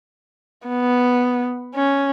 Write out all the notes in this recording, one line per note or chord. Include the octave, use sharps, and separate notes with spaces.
B3
C#4